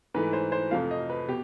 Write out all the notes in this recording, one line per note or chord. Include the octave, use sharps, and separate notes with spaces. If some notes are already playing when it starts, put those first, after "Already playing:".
G#2 E3 A3 B4
C5
C5
F2 C3 F3 A3 F5
D#5
B4
B2 G4